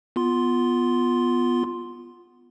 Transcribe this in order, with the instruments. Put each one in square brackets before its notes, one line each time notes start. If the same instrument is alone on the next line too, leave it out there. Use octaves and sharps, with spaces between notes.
[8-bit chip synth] B3 F4 C6